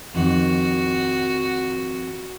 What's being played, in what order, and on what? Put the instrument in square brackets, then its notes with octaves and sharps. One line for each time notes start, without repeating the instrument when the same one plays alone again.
[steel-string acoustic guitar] F2 D#3 [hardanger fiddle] F#4